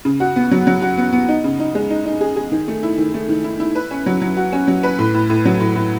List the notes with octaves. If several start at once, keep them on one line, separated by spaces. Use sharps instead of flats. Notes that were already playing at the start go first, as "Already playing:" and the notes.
C#3
F#4
B3
F#3
F#3
F#4
B3
B3
D#4
C#3
D#4
G#3
D#4
D#4
G#4
G#4
D#3
A3
E4
D#3
A3
D#3
E4
E4
B4
C#4
F#3
F#3
F#4
C#4
F#3
B4
A2
A2
A2
F#3
A2
A2